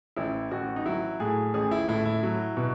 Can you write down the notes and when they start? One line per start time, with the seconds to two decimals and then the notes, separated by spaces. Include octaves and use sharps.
0.16 A1 E4
0.51 A1 F#4
0.76 D#4
0.86 F#3 E4
1.20 A2 G#4
1.54 A1 G#4
1.71 E4
1.88 A2 E4
2.06 E4
2.23 F#3
2.57 B2